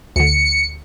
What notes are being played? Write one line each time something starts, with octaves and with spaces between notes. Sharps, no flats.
D2 D3 C#7